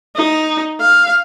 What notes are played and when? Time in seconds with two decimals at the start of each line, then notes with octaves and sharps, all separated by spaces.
0.15 D#4
0.80 F5